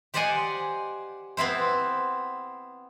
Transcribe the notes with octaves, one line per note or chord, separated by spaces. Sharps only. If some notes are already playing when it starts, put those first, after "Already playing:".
G4 C5 D5 D#5 F#5 G#5
B3 C4 E4 C5